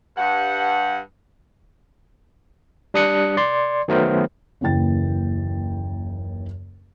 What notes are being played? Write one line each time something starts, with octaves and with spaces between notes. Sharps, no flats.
G2 F#5
G3 D4 D#6 F#6 C#7
D5 C6
D#3 F#3 A3 B3 A#4 C5
F#1 D#2 C#3 E3 G5 A6